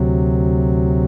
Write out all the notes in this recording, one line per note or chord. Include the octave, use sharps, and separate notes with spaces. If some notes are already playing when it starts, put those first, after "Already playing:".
Already playing: D2 C3 F#3